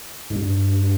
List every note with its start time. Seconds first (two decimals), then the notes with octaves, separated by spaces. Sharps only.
0.30 G#2
0.35 G2